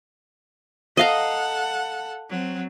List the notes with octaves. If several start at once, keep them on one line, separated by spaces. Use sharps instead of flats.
A4 D#5 F5 F#5 A#5
F#3 C4